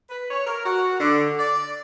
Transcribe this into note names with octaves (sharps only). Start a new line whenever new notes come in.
B4
C#5
A#4
F#4
D3
D5